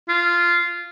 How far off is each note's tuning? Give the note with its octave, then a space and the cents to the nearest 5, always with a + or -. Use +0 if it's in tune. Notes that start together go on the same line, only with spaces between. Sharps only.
F4 -10